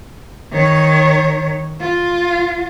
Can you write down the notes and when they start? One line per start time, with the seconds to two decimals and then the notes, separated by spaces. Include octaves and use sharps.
0.52 D#3 C#5
1.81 F4